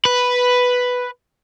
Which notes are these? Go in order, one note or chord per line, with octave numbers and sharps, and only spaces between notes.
B4